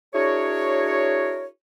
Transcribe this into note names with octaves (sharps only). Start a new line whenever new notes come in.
D4 E4 F#4 G#4 A#4 C#5